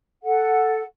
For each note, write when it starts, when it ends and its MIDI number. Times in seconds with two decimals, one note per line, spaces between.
0.25 0.83 69
0.25 0.83 78